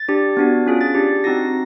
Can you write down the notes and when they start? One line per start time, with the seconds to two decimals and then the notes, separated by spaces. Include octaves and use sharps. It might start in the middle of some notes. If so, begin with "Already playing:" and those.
Already playing: A6
0.08 D4 G4
0.37 B3 D4 F#4
0.67 C#4 F4 G#4
0.81 A6
0.95 D4 G4
1.24 C4 D#4 F#4 A#6